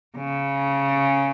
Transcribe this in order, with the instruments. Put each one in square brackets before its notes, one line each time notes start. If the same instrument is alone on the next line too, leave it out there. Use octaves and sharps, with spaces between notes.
[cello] C#3